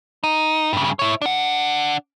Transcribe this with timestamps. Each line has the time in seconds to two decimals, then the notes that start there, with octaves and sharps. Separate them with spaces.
0.24 D#4
0.73 G2 C#3
0.99 E4 C#5
1.22 D4 F#5